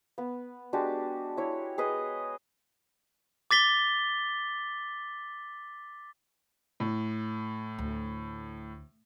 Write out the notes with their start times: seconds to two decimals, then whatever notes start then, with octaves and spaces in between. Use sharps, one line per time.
0.18 B3
0.73 G#3 D4 F#4 G4
1.37 E4 C#5
1.78 G#4 B4 D#5
3.51 D6 A6 B6 G7
6.80 A2
7.79 D2